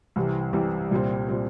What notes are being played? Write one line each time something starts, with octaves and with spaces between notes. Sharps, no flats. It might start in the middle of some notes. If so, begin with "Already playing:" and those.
C2 C3 E3 G3
C2 C3 E3 G3
C2 A#2 G3 C4
A#2 G3 C4